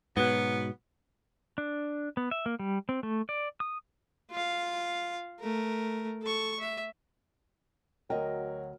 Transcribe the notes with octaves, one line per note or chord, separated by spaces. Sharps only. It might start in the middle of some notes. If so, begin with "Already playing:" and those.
G#2 B2 F#3 B3
D4
B3
E5
A#3
G3
C4
A3
D5
D#6
F4 F5
A3 A#4
A4 C#6
E5
D2 F#3 A#4 D#5 G5